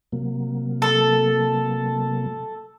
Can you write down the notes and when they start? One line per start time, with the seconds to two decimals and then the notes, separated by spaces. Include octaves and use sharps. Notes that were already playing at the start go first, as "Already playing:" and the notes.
0.12 C3 F#3 A#3
0.82 A4